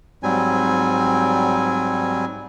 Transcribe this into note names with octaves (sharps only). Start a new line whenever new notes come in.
G#2 F#3 G3 C4 G#5